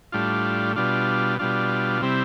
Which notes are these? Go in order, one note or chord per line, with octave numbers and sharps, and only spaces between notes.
A2 G3 D4 F4
B2 G3 D4 F4
B2 G3 D4 F4
C3 G3 C4 E4